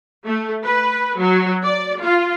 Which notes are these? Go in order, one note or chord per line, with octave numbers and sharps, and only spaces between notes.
A3
B4
F#3
D5
F4